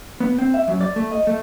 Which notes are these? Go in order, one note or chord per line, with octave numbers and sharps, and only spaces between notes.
B3
C4
E5
F#2
D5
A3
D#5
A3